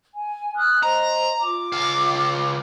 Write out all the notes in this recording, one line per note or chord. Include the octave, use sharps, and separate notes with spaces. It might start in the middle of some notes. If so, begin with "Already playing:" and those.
G#5
D#6 F6 F#6
C5 D#5 A#5
F4 D6
C#2 F5